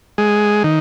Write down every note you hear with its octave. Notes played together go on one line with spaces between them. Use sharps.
G#3
D#3